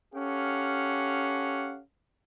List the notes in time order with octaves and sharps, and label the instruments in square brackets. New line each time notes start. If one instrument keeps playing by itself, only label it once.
[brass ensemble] C#4 G4 A4 F5 F#5